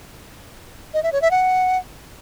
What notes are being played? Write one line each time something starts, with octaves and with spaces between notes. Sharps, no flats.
D#5
E5
C#5
E5
F#5